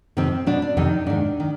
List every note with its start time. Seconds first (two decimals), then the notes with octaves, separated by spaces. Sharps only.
0.17 F2 C3 D#3 C4
0.47 B2 D4
0.62 D4
0.77 F2 C3 D#3 D#4
1.06 G#2 D#3 D4
1.40 D#3